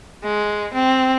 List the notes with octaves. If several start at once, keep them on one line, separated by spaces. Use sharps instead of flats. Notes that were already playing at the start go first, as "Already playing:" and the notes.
G#3
C4